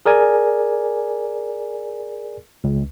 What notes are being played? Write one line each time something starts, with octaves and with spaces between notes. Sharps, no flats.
G#4 A#4 D5 G#5
C#2